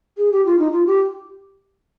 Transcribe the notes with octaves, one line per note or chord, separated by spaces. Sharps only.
G#4
G4
F4
D#4
F4
G4